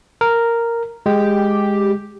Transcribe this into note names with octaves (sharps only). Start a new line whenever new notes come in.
A#4
G#3 G4